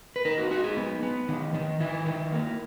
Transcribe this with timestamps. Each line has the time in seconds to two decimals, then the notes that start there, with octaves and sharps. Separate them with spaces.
0.16 B4
0.25 D#4 A#4
0.38 F#4
0.51 D#4 F#4
0.64 G#4
0.77 B3
1.03 B3
1.28 D#3
1.54 D#3
1.80 D#3 E4
2.06 D#3
2.32 A#3